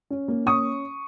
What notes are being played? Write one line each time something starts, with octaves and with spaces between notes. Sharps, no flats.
C#4
A#3
C#4 C#6 D#6